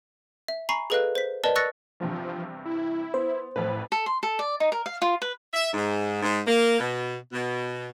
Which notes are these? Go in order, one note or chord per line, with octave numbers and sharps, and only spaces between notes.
E5
G#5 A#5 B5 C#6 C7
G#4 A4 B4 D#5 F5 F#6
C5 B6
A#4 B4 D5 D#5 A5
C#6 E6 F#6 A6 A#6 C#7
E2 G2 C3 F3
E4
B3 C5
A1 F2 A2 B4
A4
C6
A4
D5
D#4
A#4
F5
F4
B4
E5
G#2
G#2
A#3
B2
B2